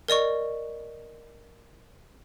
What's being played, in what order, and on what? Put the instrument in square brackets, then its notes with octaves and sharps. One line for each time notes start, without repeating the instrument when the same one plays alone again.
[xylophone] A#4 D5 D#5 C#6